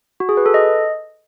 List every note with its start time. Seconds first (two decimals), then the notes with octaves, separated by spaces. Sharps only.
0.20 F#4
0.29 G#4
0.37 B4
0.46 A4
0.54 D#5